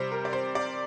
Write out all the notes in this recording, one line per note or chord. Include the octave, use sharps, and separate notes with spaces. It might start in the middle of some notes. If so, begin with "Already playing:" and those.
Already playing: C3 G3 C4 C5
A#4
D5
C5
D5